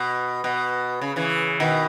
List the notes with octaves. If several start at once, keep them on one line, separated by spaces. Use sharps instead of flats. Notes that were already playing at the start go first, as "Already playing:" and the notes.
Already playing: B2
B2
C#3
C#3 E3
B2 D#3